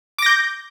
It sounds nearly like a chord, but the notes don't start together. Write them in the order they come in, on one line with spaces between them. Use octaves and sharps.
D6 A#6 G6